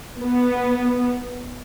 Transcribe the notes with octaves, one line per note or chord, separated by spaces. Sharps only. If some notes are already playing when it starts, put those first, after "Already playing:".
B3